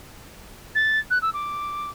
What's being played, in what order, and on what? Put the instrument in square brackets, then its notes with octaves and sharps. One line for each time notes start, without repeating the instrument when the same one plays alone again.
[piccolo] A6
F#6
E6
D6